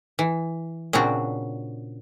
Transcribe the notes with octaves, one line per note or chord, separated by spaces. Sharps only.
E3
A#2 C#3 C4 D4 F#4